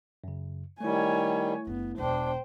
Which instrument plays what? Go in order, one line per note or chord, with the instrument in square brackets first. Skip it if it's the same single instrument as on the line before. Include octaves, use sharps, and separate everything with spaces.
[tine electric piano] F#2 C#3
[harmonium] D#3 G3 [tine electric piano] A3 E4 [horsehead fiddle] C#5 G#5
[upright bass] F#1 D4 [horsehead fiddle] B3
[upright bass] E1 D2 [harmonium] D4 [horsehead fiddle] C5 G5